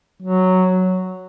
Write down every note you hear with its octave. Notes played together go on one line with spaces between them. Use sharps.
F#3